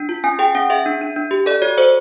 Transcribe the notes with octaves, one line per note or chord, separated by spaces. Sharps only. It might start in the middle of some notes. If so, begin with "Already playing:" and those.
Already playing: D4
F4
C#4 G#5
G#4 G5
C#4 F#5
G#4 E5
D4
D4
D4
G4
A4 D5
F#4 C#5
A4 C5